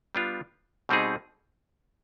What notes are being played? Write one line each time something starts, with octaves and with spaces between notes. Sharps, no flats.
G3 B3 D4 F4
B2 G3 C4 D#4 G#4